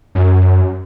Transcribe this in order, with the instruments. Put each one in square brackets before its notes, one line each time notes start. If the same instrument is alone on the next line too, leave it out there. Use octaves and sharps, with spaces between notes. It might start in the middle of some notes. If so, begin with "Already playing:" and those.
[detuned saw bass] F#2